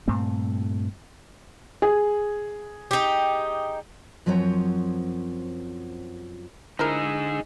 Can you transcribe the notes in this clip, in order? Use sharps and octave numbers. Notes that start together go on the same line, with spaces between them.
G2 A#2 A3 C4
G#4
D#4 G4
F#2 F3 F#3 C4 C#5 A#5
D3 F3 D#4 E4 G#4 A#4 E6